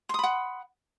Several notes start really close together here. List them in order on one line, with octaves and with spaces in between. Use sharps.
C6 D#6 B5 F#5